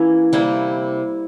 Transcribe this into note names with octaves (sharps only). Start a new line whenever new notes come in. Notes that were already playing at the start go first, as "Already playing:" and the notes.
Already playing: E3 A#3 C#4 E4
C3 G3 A#3 E4